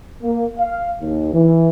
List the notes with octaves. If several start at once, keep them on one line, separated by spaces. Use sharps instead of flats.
A#3
F5
D#2
E3